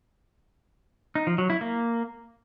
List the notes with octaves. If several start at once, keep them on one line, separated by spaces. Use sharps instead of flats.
D#4
F3
F#3
E4
A#3